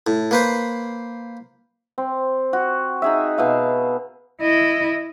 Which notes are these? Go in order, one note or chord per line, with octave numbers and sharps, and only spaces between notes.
A2
A#3 B4 C5
C4
F#4
D#4 G#4 E5
B2 E5 F5
E4 D#5